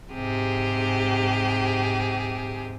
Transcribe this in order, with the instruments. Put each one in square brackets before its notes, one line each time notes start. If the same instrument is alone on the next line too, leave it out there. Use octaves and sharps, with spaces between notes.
[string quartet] G#2 C3 G4 G#4